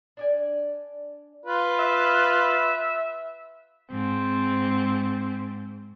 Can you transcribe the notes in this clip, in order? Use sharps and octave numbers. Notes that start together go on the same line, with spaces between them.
D4 D5 G#5
F4 B4
E5
G#2 C4